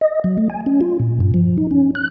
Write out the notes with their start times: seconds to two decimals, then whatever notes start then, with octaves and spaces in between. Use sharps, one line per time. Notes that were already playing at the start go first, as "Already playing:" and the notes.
0.01 D#5
0.24 F#3
0.38 A3
0.50 G#5
0.66 C#4
0.81 F4
1.00 A#2
1.20 G2
1.34 F3
1.58 D#4
1.71 C#4
1.95 F#6